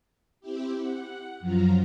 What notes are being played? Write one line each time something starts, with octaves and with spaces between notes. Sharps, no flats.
C4 E4 G4
F#5
F#2 F3 F#3 F4 A#5